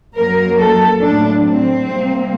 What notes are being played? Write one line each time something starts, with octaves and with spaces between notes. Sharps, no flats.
F#2 F#3 A#3 A#4
A4
A2 F#3 A3 D4
C4
C3 G3 A#3